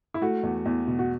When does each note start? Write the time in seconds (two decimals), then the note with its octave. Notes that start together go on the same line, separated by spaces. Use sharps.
0.14 E4
0.22 A3 F#4
0.43 E2
0.66 E2
0.88 B2
0.99 F#4